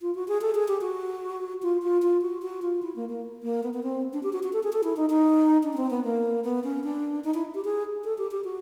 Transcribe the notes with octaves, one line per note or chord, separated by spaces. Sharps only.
F4
F#4
G#4
A4
G#4
G4
F#4
F4
F4
F4
F#4
F#4
F4
E4
A#3
A#3
A#3
B3
B3
C4
D4
G4
F#4
F#4
A4
G#4
A4
E4
D#4
D#4
D4
C#4
C4
B3
A#3
B3
C#4
D4
D#4
E4
G4
G#4
A4
G4
G4
F#4